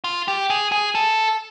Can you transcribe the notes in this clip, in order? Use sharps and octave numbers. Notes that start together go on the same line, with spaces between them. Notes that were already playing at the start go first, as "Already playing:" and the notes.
F4
G4
G#4
G#4
A4